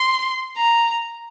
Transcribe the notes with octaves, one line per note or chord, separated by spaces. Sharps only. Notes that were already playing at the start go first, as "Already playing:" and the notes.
Already playing: C6
A#5